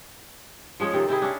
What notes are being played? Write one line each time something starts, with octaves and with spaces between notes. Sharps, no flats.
F3 G#3 C#4 C#5
C3 D#3 A4
C3 C4 E4 G#4
C#4 D4